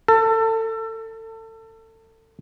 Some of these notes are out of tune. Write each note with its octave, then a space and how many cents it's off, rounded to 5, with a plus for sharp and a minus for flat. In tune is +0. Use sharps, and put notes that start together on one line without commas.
A4 +30